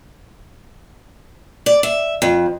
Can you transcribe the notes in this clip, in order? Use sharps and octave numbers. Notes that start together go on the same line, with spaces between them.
D5
E5
F2